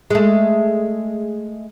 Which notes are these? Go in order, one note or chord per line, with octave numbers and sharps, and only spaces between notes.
G#3 A3